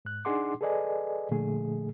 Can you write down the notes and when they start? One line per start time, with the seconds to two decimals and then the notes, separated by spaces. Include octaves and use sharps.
0.05 G#2 F#6
0.25 D4 D#4 G#4 F#5 C6 D6
0.61 G#4 A4 B4 D5 D#5 G#5
1.31 A#2 D3 F3 A3 G#4